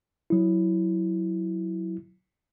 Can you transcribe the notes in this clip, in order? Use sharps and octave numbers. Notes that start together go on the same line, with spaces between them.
F#3 E4